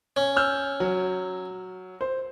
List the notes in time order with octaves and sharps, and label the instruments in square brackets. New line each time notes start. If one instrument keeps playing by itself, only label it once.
[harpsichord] C#4
[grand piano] E6 F6 G6
F#3
C5